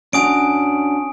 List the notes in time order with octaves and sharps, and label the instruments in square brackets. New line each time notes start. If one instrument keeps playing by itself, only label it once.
[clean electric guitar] C#4 D4 F#4 [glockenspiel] G#5 D#6 D7